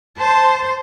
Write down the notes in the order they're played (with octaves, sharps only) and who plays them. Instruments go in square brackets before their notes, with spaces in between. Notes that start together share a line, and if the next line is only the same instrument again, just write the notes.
[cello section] C5 [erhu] A5